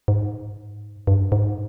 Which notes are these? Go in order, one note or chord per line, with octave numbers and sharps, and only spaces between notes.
G#2
G2
G#2